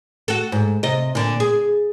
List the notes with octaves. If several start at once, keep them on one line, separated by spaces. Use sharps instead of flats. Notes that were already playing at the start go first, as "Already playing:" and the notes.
F#4 A4
G#2
C3 D#5
A#2 D3
G#4